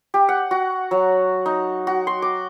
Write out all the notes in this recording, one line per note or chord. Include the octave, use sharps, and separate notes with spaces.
G4
F#5
F#4
F#3
D#4
F#4
C6
D6